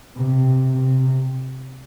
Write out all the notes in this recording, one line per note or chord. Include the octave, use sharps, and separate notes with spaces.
C3
C3